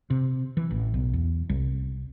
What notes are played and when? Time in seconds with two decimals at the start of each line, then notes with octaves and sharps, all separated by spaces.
0.10 C3
0.57 E3
0.71 A1
0.94 B1
1.13 E2
1.49 C2